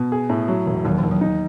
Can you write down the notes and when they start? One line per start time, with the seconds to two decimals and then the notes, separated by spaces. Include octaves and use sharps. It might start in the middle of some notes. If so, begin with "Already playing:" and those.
Already playing: B2
0.12 G#4
0.29 A2
0.48 F#3
0.66 E1
0.85 D#2 F#3
0.98 D#2 E3
1.11 F#3
1.21 D#4